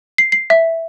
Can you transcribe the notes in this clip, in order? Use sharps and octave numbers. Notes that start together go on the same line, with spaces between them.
C7
C7
E5